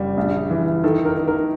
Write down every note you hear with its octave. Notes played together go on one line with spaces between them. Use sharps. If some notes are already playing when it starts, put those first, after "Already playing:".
Already playing: F#1 G3
A#1
E3
D#3 A4
A#4
D#3
A#4